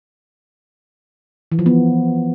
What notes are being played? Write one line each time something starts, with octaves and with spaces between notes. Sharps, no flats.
E3
F3
B3